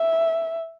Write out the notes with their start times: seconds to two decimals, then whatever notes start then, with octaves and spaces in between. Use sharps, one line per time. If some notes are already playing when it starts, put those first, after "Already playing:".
Already playing: E5